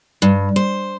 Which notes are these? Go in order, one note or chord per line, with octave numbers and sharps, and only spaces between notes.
G2
C5